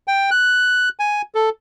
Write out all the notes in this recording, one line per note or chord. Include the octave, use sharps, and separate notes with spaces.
G5
F#6
G#5
A4